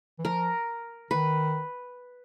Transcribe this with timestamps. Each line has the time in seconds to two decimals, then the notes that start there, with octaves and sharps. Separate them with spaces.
0.19 E3
0.24 F3 A#4
1.11 D#3 B4